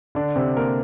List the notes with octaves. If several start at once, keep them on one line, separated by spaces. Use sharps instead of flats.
D3 D4
C3 C4
A#3 A#4